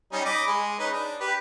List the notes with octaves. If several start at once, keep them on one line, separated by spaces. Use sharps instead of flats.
G3 C#4 D#4
D#5 B5 D6
G#3
C#4 D#4 B4
D4
G4 B4